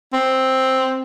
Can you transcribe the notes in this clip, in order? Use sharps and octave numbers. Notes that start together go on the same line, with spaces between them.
C4